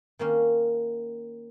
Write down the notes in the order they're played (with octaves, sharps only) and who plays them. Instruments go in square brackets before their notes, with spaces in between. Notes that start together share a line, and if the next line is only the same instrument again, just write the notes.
[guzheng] D#3 A#3 C#4